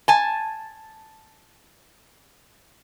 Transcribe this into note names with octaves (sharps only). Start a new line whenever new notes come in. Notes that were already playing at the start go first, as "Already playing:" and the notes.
G#5 A5